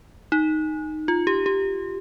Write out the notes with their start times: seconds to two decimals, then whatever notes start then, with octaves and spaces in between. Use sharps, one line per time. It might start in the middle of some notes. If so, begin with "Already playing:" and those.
0.32 D#4
1.08 F4
1.27 G4
1.46 G4